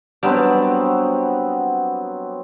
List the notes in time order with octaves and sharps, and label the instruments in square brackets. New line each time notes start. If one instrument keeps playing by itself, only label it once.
[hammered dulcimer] F#3 B3 C4 [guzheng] G3 D4